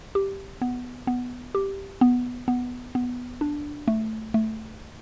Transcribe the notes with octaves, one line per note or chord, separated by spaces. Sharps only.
G4
B3
B3
G4
B3
B3
B3
D4
A3
A3